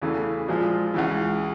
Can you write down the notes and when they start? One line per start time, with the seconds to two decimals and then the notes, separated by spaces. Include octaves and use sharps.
0.02 E2 C#3 E3 A3
0.48 A#2 F3 G#3
0.94 C#2 C#3 E3